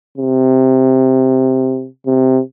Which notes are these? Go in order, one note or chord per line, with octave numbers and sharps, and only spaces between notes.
C3
C3